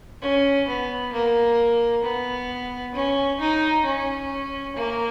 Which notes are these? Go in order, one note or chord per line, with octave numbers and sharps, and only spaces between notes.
C#4
B3
A#3
B3
C#4
D#4
C#4
A#3